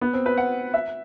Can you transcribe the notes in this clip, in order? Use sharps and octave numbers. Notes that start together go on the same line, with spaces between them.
B3
C4
B4
F#5
E5